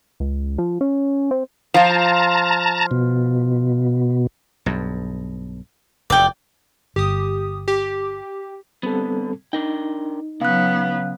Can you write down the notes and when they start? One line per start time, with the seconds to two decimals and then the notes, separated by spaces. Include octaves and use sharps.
0.20 C#2
0.58 F3
0.81 C#4
1.31 C4
1.74 F3 F4 A5 A#5
2.91 B2
4.66 B1 G2
6.10 F1 E2 D5 G5
6.96 G1 G4 D#6
7.68 G4
8.83 D3 G3 B3 C4 A4
9.53 D4 D#4 A#4 G5
10.42 C#3 F#3 B3 F5 F#6